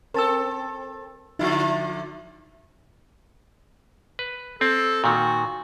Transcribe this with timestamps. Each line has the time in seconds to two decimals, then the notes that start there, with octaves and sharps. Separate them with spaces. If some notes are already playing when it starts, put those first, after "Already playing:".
0.14 C4 A4 A#4 A5 E6
1.39 D3 F3 D#4 E4
4.19 B4
4.61 C4 A4
5.04 A#2 D#3 F#4